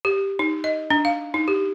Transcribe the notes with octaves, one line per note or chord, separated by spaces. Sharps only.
G4
D#4
D#5
D4
F5
D#4
G4